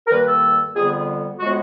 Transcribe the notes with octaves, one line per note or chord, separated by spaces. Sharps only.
A#4
G2 D#3 G3 A#3 B4
A4
F2 D3 G3 B3 G#4
A2 F3 G#3 B3 F#4